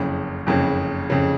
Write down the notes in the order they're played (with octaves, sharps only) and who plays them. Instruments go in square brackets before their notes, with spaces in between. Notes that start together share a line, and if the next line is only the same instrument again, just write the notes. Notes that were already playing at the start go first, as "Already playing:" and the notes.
Already playing: [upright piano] F#1 F2 C#3
F#1 F2 C#3
F2 C#3